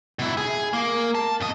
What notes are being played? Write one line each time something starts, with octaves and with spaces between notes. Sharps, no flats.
B2 E4
G#4
A#3
A5
F2 D#5